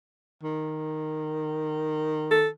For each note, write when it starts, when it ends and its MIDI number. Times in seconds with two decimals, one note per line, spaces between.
0.43 2.53 51
2.31 2.48 69